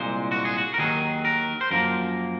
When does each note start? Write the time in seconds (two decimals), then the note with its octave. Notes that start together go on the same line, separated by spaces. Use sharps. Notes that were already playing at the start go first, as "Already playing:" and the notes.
Already playing: C2 A#2 G#3 C5
0.32 F#4
0.45 G#4
0.58 F#4
0.74 A#4
0.78 D#2 D#3 F#3 G#4
1.25 A#4
1.61 C5
1.71 F#2 F3 A#3 A#4